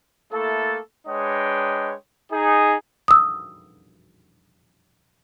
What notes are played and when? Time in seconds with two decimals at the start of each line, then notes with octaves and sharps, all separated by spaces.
0.33 A3 A#3 E4 A4
1.07 G#3 D4 B4 C#5 D#5 G5
2.32 D#4 G#4
3.08 D#6 E6